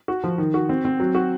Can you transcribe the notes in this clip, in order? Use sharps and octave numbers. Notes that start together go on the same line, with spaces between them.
F#4
F3
D#3
F#4
C4
C4
F#3
F#4